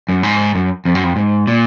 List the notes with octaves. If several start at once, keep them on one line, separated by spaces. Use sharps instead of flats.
F#2
G#2
F#2
F2
F#2
F2
G#2
A#2